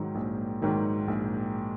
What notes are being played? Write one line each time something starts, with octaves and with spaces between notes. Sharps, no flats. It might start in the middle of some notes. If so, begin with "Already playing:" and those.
Already playing: G#2 D#3 F#3
A#1
G#2 D#3 F#3
A#1